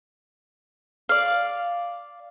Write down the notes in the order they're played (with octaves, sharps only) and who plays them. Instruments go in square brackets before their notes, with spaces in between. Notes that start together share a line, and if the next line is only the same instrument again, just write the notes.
[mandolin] D5 F5